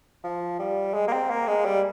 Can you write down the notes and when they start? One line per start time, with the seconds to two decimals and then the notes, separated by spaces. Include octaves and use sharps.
0.24 F3
0.59 G3
0.94 G#3
1.07 A#3
1.13 C4
1.30 A#3
1.48 G#3
1.65 G3